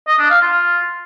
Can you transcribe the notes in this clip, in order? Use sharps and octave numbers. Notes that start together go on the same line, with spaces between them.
D#5
D4
F5
F4